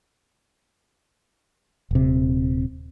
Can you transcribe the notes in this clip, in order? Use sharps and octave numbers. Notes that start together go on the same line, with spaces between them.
D#1 C3